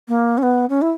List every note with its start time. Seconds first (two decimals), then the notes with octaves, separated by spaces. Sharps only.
0.08 A#3
0.38 C#4
0.43 B3
0.69 C#4
0.82 E4